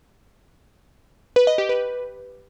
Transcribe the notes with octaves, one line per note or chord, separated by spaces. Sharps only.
B4
D#5
G4
B4